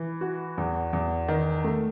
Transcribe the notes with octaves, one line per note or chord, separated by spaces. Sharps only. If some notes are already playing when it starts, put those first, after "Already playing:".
Already playing: E3
F#4
E2
E2
D#3
A3